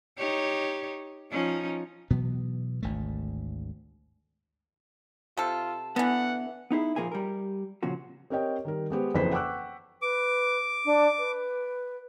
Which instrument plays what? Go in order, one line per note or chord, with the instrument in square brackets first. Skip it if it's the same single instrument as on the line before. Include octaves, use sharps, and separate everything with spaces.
[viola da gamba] D#4 G4 C#5
F3 C#4 D#4
[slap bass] B2 E3 F#3 B3
G#1 D2 A3
[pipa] C3 A4 [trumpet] F4
[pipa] D3 E3 [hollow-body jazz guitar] B3 [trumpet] F#5
[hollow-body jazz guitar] B3 D#4 E4 G#4
A#2 D#3 F3 A#3 G#4 G#5
G3 A#4
A#2 C#3 F3 F#4
[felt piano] C4 G4 A#4 C#5 D#5 G5
D#3 G3 A#4
G#3 B3 G4 C5
F#1 F2 E3 B4 C5 B6
F#5 G5 C#6 D6 E6 F#6
[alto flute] B4 [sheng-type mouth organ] D6
[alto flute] D4
B4